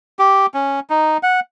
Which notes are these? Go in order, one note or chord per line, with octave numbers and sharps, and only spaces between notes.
G4
C#4
D#4
F#5